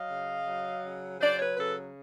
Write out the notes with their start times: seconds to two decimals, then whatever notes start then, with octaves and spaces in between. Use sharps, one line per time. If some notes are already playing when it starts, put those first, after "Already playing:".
Already playing: F#3 D#5 F5
0.09 C#3
0.46 F#3
0.83 C#3
1.20 F#3 C5 D5
1.39 B4 C#5
1.57 C#3 A4 B4